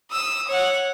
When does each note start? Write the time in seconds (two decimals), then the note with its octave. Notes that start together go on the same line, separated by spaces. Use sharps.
0.11 D#6 E6
0.48 C#5 F#5